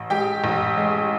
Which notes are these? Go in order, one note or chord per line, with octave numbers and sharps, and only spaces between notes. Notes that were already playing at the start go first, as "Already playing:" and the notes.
Already playing: A1
G#3 G4 G5
A1
G#3